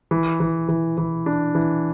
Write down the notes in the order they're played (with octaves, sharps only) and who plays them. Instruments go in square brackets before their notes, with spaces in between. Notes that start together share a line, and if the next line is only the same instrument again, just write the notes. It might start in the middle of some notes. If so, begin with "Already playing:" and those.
[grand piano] E3
E3
E3
E3
D4
E3